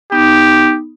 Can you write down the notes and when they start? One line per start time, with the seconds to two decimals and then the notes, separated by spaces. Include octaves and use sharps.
0.12 B3 D#4 G4